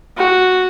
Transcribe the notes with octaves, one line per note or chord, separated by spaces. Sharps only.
F#4